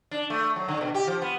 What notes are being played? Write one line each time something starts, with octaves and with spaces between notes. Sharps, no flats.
D4
A3
F#3
D3
B2
G4
F3
B3